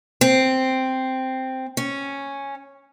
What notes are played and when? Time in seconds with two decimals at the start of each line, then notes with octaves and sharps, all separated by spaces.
0.21 C4
1.77 C#4